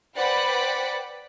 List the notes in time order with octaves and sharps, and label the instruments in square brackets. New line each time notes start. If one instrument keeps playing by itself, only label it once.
[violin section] B4 C5 D5 F#5 G5 B5